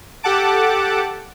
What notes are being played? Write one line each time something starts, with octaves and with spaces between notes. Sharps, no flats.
G4 A4 F#5 A5 D6